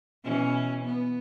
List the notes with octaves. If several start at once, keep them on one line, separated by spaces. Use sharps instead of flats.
B2 E3 C#4
B3